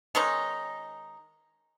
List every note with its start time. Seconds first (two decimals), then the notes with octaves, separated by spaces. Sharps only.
0.15 D#3 G#3 C#4 D#4